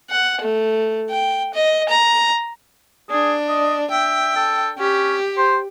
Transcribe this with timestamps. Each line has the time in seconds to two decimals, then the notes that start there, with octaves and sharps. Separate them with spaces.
0.10 F#5
0.41 A3
1.10 G5
1.54 D#5
1.89 A#5
3.10 D4 G#4
3.49 D#5
3.91 E5 G5
4.36 A4
4.79 C#4 G4
5.37 C5